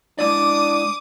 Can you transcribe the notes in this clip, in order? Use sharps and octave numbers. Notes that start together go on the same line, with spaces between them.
G#3 D4 E4 D5 D6 D#6